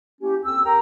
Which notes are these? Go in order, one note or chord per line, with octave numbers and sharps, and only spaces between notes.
A#3 C#4 E4 G4
D#2 C4 A4 E6
G4 A#4 G5 A#5